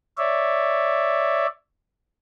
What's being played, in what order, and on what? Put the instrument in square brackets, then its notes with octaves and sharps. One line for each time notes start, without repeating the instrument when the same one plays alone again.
[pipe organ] C#5 D5 E5